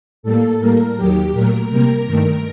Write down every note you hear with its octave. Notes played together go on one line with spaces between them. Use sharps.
A2 G3 A#3 A4
A2 G3 A#3 A#4
D#2 D#3 F#3 G4
A#2 F#3 A3 A#4
C3 G3 A#3
G2 D#3 A3